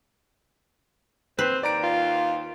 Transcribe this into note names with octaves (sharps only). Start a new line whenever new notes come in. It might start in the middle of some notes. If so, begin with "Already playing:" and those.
C4 B4
D#2 D5 A#5 D7
F4